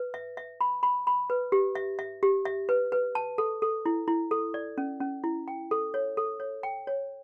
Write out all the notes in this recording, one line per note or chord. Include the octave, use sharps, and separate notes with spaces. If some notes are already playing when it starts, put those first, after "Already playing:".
Already playing: B4
E5
E5
B5
B5
B5
B4
G4
E5
E5
G4
E5
B4
B4
A5
A4
A4
E4
E4
A4
D5
C#4
C#4
E4
G5
A4
C#5
A4
C#5
G5
C#5